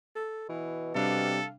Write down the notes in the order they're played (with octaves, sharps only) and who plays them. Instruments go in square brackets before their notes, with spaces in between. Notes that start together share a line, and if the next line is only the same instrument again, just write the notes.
[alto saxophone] A4
[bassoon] B2 [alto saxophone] E3
[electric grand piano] C3 G3 D4 [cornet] A4 [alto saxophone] F5